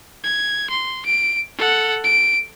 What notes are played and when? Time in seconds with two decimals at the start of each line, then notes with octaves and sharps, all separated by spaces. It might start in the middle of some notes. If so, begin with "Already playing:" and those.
0.23 G#6
0.70 C6
1.05 D7
1.57 A4 F#5
2.04 D7